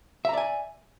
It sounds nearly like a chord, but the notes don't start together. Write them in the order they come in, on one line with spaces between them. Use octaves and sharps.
E5 A#5 D5 G#5